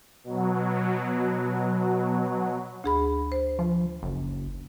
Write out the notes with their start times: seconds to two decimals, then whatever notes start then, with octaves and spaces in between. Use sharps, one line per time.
0.24 B2 F#3
2.84 D2 G#4 B5
3.32 C5
3.59 F3
4.03 F#1